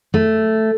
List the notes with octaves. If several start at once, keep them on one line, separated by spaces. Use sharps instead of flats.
A3